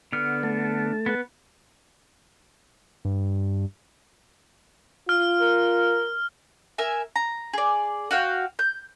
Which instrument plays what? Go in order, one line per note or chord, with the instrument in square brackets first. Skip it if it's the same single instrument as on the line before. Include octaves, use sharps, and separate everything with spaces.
[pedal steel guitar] D3 B3 F6
[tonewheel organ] A3 A5
[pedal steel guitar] B3 B4
[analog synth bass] G2
[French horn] F4 [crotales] F6
[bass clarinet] A#4
[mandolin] A#4 E5 G#5
A#5
G#4 D5
F#4 F5 G5
G6